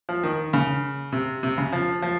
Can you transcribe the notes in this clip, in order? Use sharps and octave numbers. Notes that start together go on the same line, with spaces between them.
F3
D#3
C#3
C3
C3
C#3
F3
F3